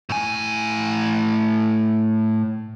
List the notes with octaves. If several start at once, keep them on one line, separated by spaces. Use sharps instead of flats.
A2 G#5